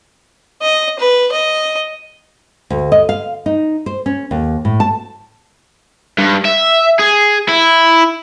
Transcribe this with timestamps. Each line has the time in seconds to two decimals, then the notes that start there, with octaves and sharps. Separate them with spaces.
0.62 D#5
0.99 B4
1.32 D#5
2.70 D2
2.92 D#5
3.09 F5
3.46 D#4
3.86 C5
4.06 C#4
4.31 D#2
4.65 A2
4.80 A5
6.18 G2
6.45 E5
6.99 G#4
7.48 E4